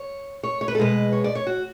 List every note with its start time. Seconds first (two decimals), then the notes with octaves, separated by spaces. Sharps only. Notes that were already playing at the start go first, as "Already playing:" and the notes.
Already playing: C#5
0.43 C#5
0.61 C#5
0.68 B4
0.75 A4
0.78 B2 G#3 B4
1.12 C#5
1.24 D5
1.35 C#5
1.47 F#4